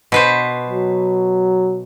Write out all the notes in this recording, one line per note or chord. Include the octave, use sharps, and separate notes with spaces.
B2 B4 C5
F#3